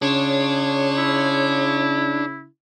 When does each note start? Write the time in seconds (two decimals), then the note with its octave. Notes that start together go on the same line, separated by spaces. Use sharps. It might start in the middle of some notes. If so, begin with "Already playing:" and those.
0.02 C#3 D4 F4 G#4 C#5
0.98 E4